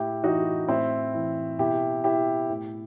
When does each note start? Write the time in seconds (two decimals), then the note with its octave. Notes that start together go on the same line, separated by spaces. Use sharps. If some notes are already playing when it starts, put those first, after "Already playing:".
Already playing: A2 E4 G4
0.23 E3 D#4 F#4
0.68 A2 C4 E4
1.14 E3
1.58 B2 E4 G4
2.04 E4 G4
2.49 A2